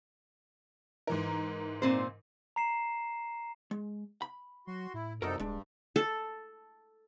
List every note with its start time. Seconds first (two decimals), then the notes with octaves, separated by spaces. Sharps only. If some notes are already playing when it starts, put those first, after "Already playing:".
1.07 G#2 E3 A#4
1.82 A#2 C4 C5
2.56 A#5 C7 E7
3.71 G#3
4.22 B5
4.67 F#3 F#4 C6
4.94 A2 E4
5.22 C2 F#2 C3 D#4 F#4 A4 A#4
5.40 D1 G2 G#3 D4
5.96 A4